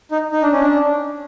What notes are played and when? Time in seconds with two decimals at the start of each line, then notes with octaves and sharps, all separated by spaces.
0.11 D#4
0.32 D#4
0.42 D4
0.52 C#4
0.61 D4